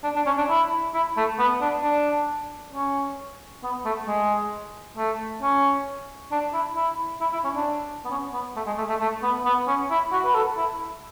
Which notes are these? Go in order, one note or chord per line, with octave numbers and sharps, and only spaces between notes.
D4
D4
C#4
D4
E4
E4
A3
B3
D4
D4
C#4
B3
A3
G#3
A3
C#4
D4
E4
E4
E4
E4
C#4
D4
B3
C#4
B3
A3
G#3
A3
A3
A3
B3
B3
C#4
E4
F#4
B4
A4
E4